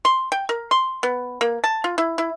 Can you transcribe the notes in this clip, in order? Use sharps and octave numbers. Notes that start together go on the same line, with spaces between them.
C6
G5
A#4
C6
B3
A#3
A5
F4
E4
E4